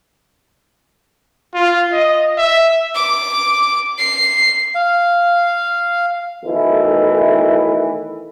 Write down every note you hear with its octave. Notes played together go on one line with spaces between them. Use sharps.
F4
D#5
E5
D6
C7
F5
B1 D#3 E3 A3 E4